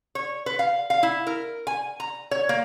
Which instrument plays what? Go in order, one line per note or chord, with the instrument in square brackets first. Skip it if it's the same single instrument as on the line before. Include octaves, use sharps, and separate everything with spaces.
[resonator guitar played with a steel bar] C#5
B4
F5
F5
E4
A#4
G#5
A#5
C#5
A#3